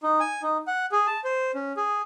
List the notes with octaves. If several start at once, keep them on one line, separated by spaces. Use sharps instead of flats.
D#4
G#5
D#4
F#5
G#4
A5
C5
C#4
G#4